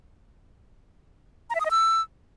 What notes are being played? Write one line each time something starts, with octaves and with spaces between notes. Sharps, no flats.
A#5
E5
D#6
D#5
E6